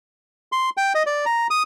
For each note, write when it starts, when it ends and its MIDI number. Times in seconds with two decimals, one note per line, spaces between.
0.52 0.70 84
0.77 0.93 79
0.95 1.03 75
1.06 1.25 74
1.26 1.47 82
1.50 1.63 87